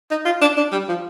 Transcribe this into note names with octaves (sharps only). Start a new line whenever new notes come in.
D#4
F4
D4
D4
G3
F3